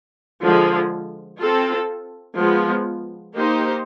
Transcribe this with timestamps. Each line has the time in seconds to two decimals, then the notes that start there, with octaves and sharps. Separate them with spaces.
0.42 D3 F3 G#3
1.41 C4 F4 A4
2.38 F3 G#3 B3
3.35 A#3 D#4 G4 C5